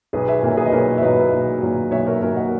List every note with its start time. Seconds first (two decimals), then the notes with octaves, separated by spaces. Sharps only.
0.13 B1 G#4 B4
0.28 E5 G#5
0.43 A#2 F#3 A#4
0.57 G#4 B4
0.66 D#5
0.72 B1 A#4 C#5
0.98 E5
1.02 A#2 F#3 B4 D#5
1.32 B1
1.62 A#2 F#3
1.91 B1 C#5 E5
2.07 A#4 C#5
2.22 A#2 F#3 A#4
2.36 D#5 F#5